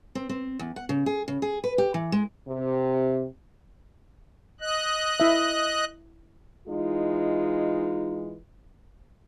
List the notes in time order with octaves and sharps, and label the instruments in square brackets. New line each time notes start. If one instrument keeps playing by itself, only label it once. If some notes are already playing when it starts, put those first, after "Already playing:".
[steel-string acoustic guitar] C4
C4
E2
F#5
C#3
G#4
C#3
G#4
B4
G4
E3
G#3
[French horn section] C3
[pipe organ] D#5 F#6
[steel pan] E4 E5
[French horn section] E3 G#3 D#4 F4